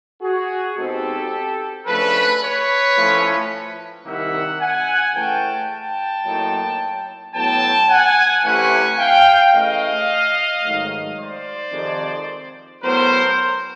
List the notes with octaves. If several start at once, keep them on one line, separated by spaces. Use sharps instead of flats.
F#4 G#4
B2 G#3 C4 D#4 G4 A4
C#3 F3 A3 D4 A4 B4
B4 C#5
A2 F3 A3 C#4
C2 C3 D#3 G3 A#3 E5 F#5
F#5 G#5
C#3 E3 A3 C#4 G5 A5
G5 A5
A2 F#3 A#3 D#4
A2 F#3 B3 G5 A5
F#5 G#5
C3 E3 A3 C#4 E4 F#5 G#5
F5 G5
C#3 E3 A3 D#5 F5
G#2 D#3 F#3 A3
C5 D5
F2 C3 D#3 G#3
A2 F#3 B3 A#4 C5